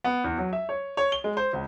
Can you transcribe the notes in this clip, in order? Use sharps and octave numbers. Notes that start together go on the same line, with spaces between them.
B3
E2
F#3
E5
C#5
C#5
G7
G#3
C5
C#2